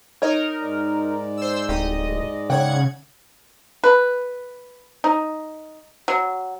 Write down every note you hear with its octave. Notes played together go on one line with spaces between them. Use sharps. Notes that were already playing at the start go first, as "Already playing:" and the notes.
D#4 A#4 C#5 D#5
G#2 G#3 D5
C5 E6
D1 D#4 G4 D#5
C#3 C#5 F#5 G5 G#6
B4
D#4
F#3